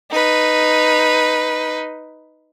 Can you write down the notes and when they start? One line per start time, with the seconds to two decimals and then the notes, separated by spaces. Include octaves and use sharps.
0.11 D#4 B4